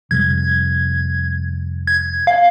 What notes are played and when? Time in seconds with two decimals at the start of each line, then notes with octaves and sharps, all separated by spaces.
0.11 F2 C3 G3 G#6
1.87 G#6
2.27 F5